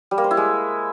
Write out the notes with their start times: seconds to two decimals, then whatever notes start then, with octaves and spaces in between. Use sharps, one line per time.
0.11 G3
0.18 A#3
0.24 C5
0.31 E4
0.37 G#3